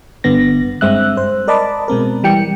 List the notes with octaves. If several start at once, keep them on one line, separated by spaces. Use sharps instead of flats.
G1 G2 D3 B3 A#6
G2 G#3 C4 E5 E6 F#6
C5
A#4 D5 D#5 A5 B5 D6
B2 G#3 C4 A#4
E3 G3 G5 C#7